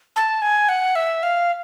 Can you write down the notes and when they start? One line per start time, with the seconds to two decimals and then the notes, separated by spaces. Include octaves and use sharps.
0.16 A5
0.42 G#5
0.69 F#5
0.95 E5
1.23 F5